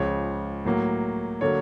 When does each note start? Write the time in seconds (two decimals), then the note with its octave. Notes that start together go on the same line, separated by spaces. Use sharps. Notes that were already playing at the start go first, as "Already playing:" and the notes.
Already playing: C#2 C#3 F3 C#5
0.65 A2 F#3 A#3
1.41 D3 F#3 A#3 C#5